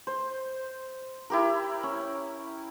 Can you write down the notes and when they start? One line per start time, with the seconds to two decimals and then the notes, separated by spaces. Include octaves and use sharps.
0.07 C5
1.30 E4 G4 A#4
1.83 C#4